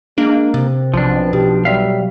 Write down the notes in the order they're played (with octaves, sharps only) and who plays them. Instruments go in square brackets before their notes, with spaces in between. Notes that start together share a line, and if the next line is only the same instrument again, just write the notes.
[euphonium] G#3 [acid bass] A#3 [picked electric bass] D4
[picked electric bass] C3 [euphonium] C4
[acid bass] B1 [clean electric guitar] F3 D4
[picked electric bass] B2 [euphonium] G4
[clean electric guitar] F#3 E5 F5 [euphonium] G3